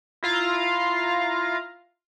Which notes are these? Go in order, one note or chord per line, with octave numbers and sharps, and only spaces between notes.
E4 F4 F5 A#5